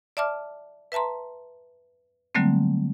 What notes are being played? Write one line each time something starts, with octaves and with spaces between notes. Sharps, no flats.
D5 E5 A5 D6 F6
B4 E5 A5 A#5 C6
D3 F#3 G3 A3 A#3 C4